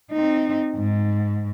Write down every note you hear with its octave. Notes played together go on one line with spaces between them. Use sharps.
C4 D#4
G#2